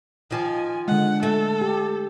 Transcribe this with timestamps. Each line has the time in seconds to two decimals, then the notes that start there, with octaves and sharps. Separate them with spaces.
0.31 D#3 F3 G#5
0.88 D3 G#3 F#5
1.23 A3 A4
1.61 G4